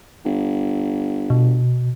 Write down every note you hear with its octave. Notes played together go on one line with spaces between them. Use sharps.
G1
B2